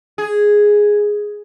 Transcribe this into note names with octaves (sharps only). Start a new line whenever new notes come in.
G#4